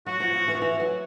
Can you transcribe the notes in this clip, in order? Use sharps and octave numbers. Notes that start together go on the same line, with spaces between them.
F#3 F#4
F3
F3
E3
F3
E3
F#3